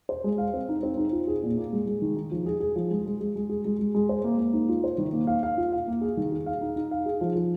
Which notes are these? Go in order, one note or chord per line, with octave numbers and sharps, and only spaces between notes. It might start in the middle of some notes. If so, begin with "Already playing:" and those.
C5
G#3
F5
C4
D#4
C4
D#4
F4
G#4
A#2
A#3
G#3
G#3
D#3
D#4
F3
G#4
G#4
F3
G#3
G#3
G#3
G#3
G#4
G#3
G#3
G#3
C5
A#3
A#3
D#4
F4
C5
D#3
A#3
F5
F5
F4
F5
A#3
G#4
D#3
G#4
F5
D#4
D#4
F5
G#4
F3
F3